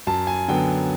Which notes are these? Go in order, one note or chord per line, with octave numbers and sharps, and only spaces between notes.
F#2 A5
G#5
D3 F#3 B3 G5